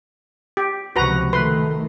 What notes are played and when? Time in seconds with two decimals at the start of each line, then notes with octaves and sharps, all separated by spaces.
0.57 G4
0.96 C#2 C3 F3 F#4 B4 A#5
1.33 D#3 A3 B4 C6